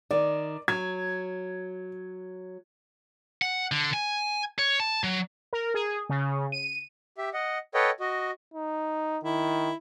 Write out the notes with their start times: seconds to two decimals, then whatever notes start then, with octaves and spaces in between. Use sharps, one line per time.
0.11 D#3 D5
0.68 F#3 G#6
3.42 F#5
3.72 D3
3.94 G#5
4.59 C#5
4.80 A5
5.04 F#3
5.53 A#4
5.74 G#4
6.09 C#3
6.52 D#7
7.18 G4 E5
7.33 D#5 F#5
7.74 A4 B4 C#5 D#5 F#5 G5
8.00 F#4 D#5
8.54 D#4
9.24 D#3 E4